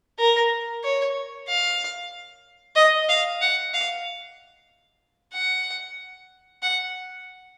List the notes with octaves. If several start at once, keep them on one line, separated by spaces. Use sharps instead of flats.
A#4
C#5
F5
D#5
F5
F#5
F5
F#5
F#5